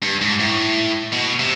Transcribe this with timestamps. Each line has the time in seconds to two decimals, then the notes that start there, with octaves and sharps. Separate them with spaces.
0.03 G2
0.21 G#2
0.39 A2
1.12 B2
1.40 C3